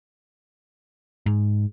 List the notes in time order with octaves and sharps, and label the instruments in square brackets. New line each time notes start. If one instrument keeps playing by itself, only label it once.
[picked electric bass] G#2